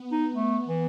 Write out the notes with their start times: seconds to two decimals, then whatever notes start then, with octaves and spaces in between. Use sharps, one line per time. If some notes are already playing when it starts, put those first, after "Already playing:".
Already playing: B3
0.12 D#4
0.34 A3
0.68 E3